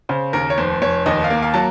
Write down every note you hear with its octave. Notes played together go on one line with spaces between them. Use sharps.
C#3 C5
D#2 A#4
C#5
F1 C5
F1 C#5
D#2 D#5
F5
A#3
F5
F#3 A5